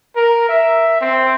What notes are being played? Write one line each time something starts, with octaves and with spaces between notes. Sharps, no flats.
A#4
E5
C4